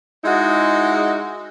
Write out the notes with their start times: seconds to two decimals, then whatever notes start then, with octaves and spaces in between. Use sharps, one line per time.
0.24 G#3 D#4 E4 F#4